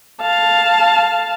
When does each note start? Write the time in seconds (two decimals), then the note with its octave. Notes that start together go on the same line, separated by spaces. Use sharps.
0.22 F5 A5